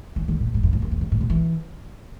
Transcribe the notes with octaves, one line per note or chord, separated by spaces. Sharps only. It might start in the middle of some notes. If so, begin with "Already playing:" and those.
E3
D#3
A#2
G#2
F#2
G#2
F#2
E2
F#2
G#2
B2
E3